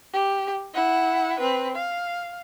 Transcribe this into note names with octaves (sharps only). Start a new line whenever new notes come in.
G4
E4 F#5
C4 B4
F5